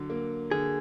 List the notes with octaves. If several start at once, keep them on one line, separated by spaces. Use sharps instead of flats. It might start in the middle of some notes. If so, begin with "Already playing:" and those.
Already playing: D3 F#3
A#3
D3 G#4